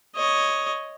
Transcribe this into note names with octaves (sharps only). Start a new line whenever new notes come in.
C#5 D#5